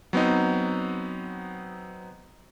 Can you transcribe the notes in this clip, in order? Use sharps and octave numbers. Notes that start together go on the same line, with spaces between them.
F#3 B3 C4 D#4